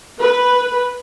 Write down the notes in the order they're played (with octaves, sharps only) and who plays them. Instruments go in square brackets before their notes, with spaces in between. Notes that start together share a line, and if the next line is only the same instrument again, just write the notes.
[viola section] B4